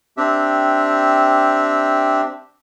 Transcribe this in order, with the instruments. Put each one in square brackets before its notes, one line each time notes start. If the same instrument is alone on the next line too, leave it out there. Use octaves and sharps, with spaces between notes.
[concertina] C4 D4 G4 E5